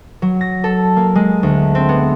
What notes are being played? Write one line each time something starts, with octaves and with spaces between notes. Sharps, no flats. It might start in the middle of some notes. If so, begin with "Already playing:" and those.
F#3
A#6
A4
A#3
G#3
D2
C4
B3